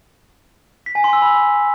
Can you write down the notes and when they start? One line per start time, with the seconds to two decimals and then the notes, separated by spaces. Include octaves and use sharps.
0.86 B6
0.95 G#5
1.04 C6
1.13 E6
1.22 B5